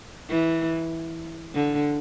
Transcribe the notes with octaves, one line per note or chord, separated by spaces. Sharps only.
E3
D3